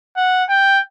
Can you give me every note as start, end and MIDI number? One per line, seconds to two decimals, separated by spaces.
0.17 0.44 78
0.49 0.80 79